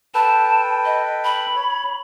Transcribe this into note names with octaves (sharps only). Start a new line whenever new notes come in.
A4 B4 G5 A5
D#5
B5
C#5